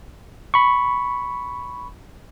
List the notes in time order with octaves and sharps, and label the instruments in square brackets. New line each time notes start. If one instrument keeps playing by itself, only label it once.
[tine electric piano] B5 C#6